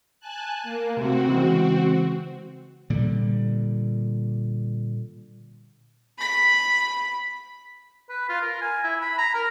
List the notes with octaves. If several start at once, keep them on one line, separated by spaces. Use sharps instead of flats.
G#5 A5 F#6
A#3
C3 A3 C4 F#4
C#3 E3 G#3
A#2 D3 G3
B5 B6
B4
F4
A#4
G#5
E4
B5
A#5
A#4